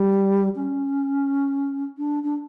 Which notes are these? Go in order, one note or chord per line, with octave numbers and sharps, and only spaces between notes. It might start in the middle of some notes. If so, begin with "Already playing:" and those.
Already playing: G3
C#4
D4
D4